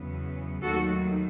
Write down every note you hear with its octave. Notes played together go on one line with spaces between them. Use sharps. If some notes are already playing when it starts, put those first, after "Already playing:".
Already playing: E2 C#3 F#3 B3
D#2 D#3 F#3 A3 F#4 A4